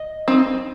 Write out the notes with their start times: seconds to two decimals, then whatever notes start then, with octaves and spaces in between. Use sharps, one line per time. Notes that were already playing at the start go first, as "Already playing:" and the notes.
Already playing: D#5
0.28 C4 D#4